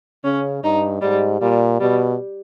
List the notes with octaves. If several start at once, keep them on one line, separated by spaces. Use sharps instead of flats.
C#3 C#4
G2 D#4
G#2 G3
A#2 G3
B2 G3